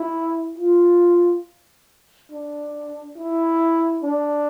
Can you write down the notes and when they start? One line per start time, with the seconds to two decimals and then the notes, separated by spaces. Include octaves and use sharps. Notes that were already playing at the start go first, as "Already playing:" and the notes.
Already playing: E4
0.58 F4
2.31 D4
3.17 E4
4.03 D4